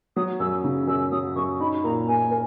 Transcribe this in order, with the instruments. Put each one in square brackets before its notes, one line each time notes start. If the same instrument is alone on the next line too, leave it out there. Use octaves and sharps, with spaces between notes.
[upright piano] F#3 [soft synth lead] D#6
[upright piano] F#2 [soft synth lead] E6
[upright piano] C#3
[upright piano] F#2 [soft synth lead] E6
[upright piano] F#3 [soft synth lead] D#6
[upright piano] F#2 [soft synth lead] C#6
[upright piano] D#4 [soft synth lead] B5
[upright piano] A#2 [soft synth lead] A#5
[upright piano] A#3 [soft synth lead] G#5
[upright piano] A#4